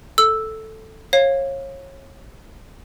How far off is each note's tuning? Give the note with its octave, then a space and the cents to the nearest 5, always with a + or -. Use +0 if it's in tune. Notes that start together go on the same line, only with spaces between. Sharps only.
A4 +0 E6 +0
C#5 -30 F5 +0